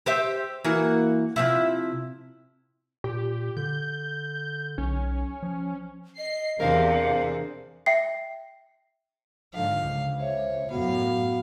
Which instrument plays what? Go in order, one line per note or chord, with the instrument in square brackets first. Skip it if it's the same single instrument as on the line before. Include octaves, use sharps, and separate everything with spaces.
[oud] G4 C5 E5
E3 A#3 F#4
C3 F3 E4
[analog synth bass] A#2 [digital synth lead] G4
[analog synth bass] D3 [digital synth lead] G6
[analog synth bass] B1 [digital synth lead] C#4
[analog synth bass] F3
[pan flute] D#5 [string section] C7
[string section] E2 C3 [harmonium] D4 G#4 C5 [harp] A#4 [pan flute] F5
[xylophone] E5 G5 C7
[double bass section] G#2 D3 F3 [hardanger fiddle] F5
[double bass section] C#2
[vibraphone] C5 E5 [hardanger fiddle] C#5
[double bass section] F#2 A2 [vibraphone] B3 F#4 F#5 [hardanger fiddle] F5